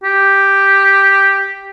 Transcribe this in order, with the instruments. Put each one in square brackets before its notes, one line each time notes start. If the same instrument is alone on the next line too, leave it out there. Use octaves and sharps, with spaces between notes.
[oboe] G4